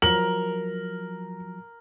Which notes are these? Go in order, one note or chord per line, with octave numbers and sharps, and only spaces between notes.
F3 F#3 A#4 F#7